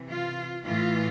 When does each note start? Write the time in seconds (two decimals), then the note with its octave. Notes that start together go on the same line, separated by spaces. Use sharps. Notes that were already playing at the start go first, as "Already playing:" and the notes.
Already playing: C3 E3
0.11 F4
0.65 A2 E3 F4